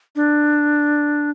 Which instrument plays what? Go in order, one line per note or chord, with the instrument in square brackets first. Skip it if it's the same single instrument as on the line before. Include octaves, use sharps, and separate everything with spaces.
[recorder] D4